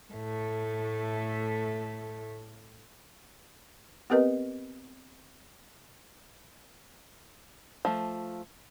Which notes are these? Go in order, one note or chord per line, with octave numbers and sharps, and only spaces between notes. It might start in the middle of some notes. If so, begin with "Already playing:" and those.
A2 A3
B3 C4 G4 A#4 B4 D#5
F3 A3